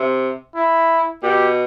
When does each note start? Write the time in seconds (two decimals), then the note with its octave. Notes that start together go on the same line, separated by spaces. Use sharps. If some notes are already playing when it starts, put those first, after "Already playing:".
Already playing: C3
0.56 E4
1.23 B2 G4